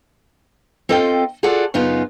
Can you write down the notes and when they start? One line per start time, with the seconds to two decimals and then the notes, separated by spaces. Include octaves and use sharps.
0.89 C4 F4 A4 D#5 F5 G5
1.43 F4 F#4 G#4 A4 D5 F#5
1.74 F#2 C#3 B3 D#4 F4